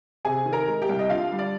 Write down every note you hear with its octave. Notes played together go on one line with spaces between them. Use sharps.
C3 G#4 G#5
D#3
A#4 A#5
G#3
G4 G5
C2
D#5
D3 F4 F5
G3
D5